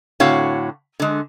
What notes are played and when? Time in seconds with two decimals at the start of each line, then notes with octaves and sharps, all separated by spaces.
0.20 A2 D3 C4 F#4 C#5 F5
1.00 D3 G#3